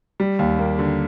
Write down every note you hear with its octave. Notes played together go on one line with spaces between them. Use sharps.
G3
D#2
A#3
D3